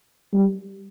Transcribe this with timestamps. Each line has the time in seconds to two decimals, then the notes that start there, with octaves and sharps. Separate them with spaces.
0.33 G3